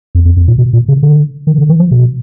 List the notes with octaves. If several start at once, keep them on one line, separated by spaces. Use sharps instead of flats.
F2
F2
F2
A#2
B2
A#2
C#3
D3
D#3
D3
E3
F3
B2